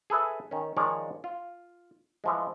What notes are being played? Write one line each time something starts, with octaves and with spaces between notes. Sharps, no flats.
G#4 A4 B4 E5
D#3 C#4
D#3 F3 G#3 F4 C#5 D5
F4
E3 F3 G#3